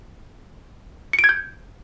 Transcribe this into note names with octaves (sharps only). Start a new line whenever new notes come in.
C#7
D7
G#6
G6